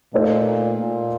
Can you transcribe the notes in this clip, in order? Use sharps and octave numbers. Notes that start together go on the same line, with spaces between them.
A#2 A3 D#4 A4 C5
A#2